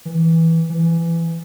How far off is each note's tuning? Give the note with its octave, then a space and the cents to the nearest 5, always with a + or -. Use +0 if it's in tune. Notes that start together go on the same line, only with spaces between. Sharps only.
E3 -10
E3 +20